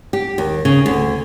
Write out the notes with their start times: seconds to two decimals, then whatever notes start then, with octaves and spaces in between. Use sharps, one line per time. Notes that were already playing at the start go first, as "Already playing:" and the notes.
0.13 G4
0.38 D#2
0.65 C#3
0.86 D2